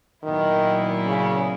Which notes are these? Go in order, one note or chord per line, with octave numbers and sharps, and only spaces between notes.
A#2 D#3 F#3 B3 E4
C#3